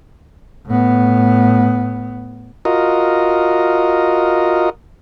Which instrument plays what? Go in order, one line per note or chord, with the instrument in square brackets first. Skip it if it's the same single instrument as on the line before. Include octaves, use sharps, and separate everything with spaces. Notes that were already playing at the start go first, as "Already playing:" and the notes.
[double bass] A2 B3
[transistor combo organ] F4 F#4 A#4 D#5